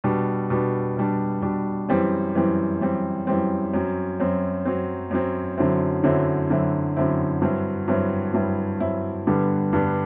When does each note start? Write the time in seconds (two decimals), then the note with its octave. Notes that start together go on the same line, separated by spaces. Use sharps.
0.04 B2 G3 D4
0.50 B2 G3 D4
0.97 B2 G3 D4
1.42 B2 G3 D4
1.89 F#2 E3 G3 C4
2.35 F#2 E3 G3 C4
2.81 F#2 E3 G3 C4
3.27 F#2 E3 G3 C4
3.74 F#2 F#3 C4
4.20 F#2 F#3 C4
4.65 F#2 F#3 C4
5.11 F#2 F#3 C4
5.58 F#2 D3 F#3 C4 E4
6.04 F#2 D3 F#3 C4 E4
6.50 F#2 D3 F#3 C4 E4
6.97 F#2 D3 F#3 C4 E4
7.42 G2 F#3 C4 E4
7.88 G2 F#3 C4 E4
8.34 G2 F#3 C4 E4
8.80 G2 F#3 C4 E4
9.27 G2 D3 G3 B3 D4
9.73 G2 D3 G3 B3 D4